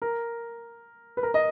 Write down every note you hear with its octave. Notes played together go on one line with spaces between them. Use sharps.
A#4
B4
A#4
D#5